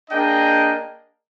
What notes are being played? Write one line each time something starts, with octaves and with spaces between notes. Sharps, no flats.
A#3 D4 G#4 D#5 G5